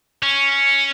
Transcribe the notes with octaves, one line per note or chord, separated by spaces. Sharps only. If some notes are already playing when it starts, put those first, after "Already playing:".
C#4